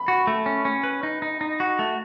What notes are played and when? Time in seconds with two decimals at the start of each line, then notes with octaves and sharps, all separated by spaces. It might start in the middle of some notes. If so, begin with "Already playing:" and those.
Already playing: B5
0.08 F#4
0.27 A3
0.46 C#4
0.65 C#4
0.84 B4
1.03 D#4
1.22 D#4
1.41 D#4
1.60 F#4
1.79 A3